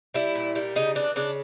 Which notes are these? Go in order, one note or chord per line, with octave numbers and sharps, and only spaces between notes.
G3 E4
A#2
G3
C#3 D#4
E3 D4
C#3 D4